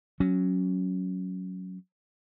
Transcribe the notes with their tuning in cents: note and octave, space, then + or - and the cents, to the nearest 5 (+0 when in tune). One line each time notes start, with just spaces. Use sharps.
F#3 +0 C#4 +0